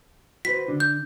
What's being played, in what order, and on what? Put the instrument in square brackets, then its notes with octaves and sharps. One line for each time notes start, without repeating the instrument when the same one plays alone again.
[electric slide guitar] F#4 B4 C5 [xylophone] B6
[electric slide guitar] D3 D4
[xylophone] G6